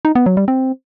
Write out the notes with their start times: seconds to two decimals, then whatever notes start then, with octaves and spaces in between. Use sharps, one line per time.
0.05 D#4
0.15 B3
0.26 F#3
0.37 G3
0.48 C4